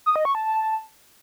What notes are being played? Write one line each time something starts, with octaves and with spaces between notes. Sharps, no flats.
D#6
D#5
C#6
A5